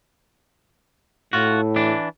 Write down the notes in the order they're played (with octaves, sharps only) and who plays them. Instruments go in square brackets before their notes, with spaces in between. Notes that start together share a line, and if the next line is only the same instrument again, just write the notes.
[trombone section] A2 [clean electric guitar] F4 F#4
[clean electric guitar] E3 D4